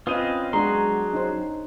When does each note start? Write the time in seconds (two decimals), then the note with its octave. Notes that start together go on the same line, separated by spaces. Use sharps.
0.07 C4 C#4 F4 B4 D#5 D#6 D#7
0.53 F#3 G#3 B3 D4 F#4 G#4 A#5 C6
1.13 C#4 D#4 C5